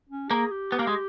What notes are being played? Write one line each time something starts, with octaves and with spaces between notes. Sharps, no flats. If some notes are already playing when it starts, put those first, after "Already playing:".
C#4
A#3 G#4
G4
B3
A#3
G#3